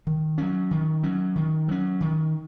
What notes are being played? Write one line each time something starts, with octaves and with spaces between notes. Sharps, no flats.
D#3
F#3 C#4
D#3
F#3 C#4
D#3
F#3 C#4
D#3